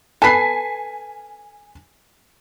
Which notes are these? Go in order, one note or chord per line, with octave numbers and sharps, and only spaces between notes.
A4 B4 G#5 B6 C7